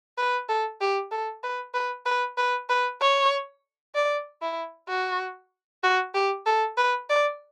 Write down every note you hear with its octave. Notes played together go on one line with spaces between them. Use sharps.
B4
A4
G4
A4
B4
B4
B4
B4
B4
C#5
D5
E4
F#4
F#4
G4
A4
B4
D5